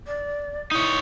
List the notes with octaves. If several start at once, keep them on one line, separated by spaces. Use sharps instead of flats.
D5
D#4 E4 C#5